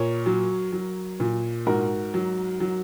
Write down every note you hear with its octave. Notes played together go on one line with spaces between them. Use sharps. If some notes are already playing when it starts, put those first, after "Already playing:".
Already playing: A#2 A#4 C#5
F#3
F#3
A#2
G#2 F#4 A#4
F#3
F#3